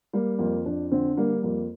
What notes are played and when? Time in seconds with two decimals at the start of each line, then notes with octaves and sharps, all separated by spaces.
0.13 G3 A#3
0.38 F2 A#3
0.65 F2 D4
0.91 D3 C4
1.17 G3 A#3
1.43 F2 A#3